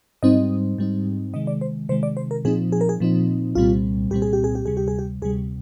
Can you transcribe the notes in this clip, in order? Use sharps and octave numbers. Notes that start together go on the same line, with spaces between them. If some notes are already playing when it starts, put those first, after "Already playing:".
G#2 G3 C4 D#4 D#5
G#2 G3 C4 D#4
C3 D#3 G#3 D#5
D5
C5
C3 D#3 G#3 C5
D5
C5
A#4
A#2 F3 C4 D#4 G#4
G#4
A#4
G#4
A#2 F3 C4 D#4
C2 A#2 G3 C4 F4
C2 A#2 G3 C4 G4
G#4
G4
G#4
G4
D2 C3 G3 G#4
G4
G#4
G4
D2 C3 G3 G#4